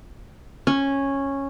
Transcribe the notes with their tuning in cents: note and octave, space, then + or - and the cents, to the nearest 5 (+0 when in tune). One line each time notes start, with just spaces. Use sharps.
C#4 -10